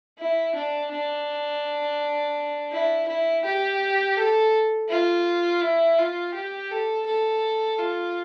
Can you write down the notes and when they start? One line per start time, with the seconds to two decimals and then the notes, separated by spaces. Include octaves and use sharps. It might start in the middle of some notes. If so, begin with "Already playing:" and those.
0.18 E4
0.55 D4
0.91 D4
2.72 E4
3.08 E4
3.44 G4
4.17 A4
4.89 F4
5.62 E4
5.98 F4
6.34 G4
6.71 A4
7.06 A4
7.78 F4